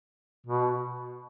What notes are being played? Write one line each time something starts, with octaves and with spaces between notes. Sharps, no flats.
B2